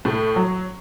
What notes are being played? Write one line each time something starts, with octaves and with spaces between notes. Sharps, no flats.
A2 A3
F#3